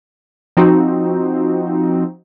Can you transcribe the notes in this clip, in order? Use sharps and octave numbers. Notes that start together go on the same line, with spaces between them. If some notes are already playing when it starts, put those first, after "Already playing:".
F3 C4 D#4 F#4